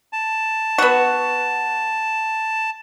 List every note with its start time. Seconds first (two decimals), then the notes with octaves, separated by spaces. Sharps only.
0.13 A5
0.78 B3 F#4